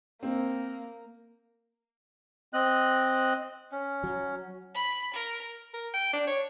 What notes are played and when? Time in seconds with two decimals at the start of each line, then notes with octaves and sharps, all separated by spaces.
0.23 A#3 C4
2.53 C4 D#5 F#6
3.72 C#4
4.04 F#3
4.74 B5
5.14 A#4
5.74 A#4
5.93 G5
6.13 D4
6.27 C#5